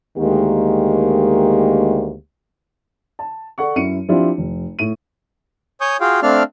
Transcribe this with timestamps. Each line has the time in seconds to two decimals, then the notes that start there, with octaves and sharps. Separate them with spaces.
0.18 D2 D#3 G#3 A#3 G4
3.19 A5
3.58 A4 D5 F#5 C#6
3.76 F#2 C#4 E4 C#7 D#7
4.09 F3 C4 D4 E4 F4 G4
4.38 F1
4.79 A2 D#7
5.81 C#5 G#5 C#6 D#6 G6
6.00 F4 F#4 G#4 F5 G5
6.23 A3 C4 D4 D5 F5 F6